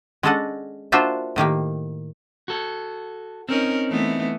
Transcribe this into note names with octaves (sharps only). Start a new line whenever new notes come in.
G#3 C#4 D4 A4 D#5 F#5
A#3 D4 F4 F#4 C5 E5
A2 D#3 A#3 G4
F#4 A4
C4 C#4 D#4 A#4
E3 A3 B3